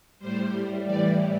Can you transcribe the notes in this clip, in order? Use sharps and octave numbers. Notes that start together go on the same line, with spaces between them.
A2 G3 C5
A2 E3 G3 D5